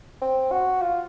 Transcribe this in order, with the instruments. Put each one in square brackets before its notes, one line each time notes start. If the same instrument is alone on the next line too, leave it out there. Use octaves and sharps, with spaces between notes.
[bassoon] C4
F#4
F4